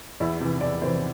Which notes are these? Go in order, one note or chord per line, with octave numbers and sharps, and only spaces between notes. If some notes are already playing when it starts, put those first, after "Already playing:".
E2 E4
C3 E3
E2 D5
C3 E3 C5